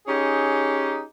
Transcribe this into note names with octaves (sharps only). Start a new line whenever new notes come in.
C#4 D#4 G4 G#4